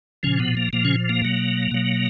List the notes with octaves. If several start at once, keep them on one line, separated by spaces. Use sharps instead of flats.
A#2 C#3 F3 C#4
B2 B3
A#3
A#2 F3 A#3
C#3 C#4
A#3
B2 F#3
B2 F#3